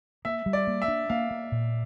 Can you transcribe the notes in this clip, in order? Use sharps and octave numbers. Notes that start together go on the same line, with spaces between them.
A#3 E5
G3
D5
A#3
E5
D4
A#3 F5
A#3
A#2